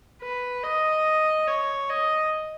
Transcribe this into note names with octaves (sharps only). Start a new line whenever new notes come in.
B4
D#5
C#5
D#5